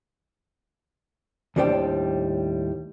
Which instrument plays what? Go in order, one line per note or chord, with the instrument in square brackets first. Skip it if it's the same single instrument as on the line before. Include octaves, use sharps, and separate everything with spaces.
[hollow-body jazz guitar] D#2 A2 G3 D4 C5 G5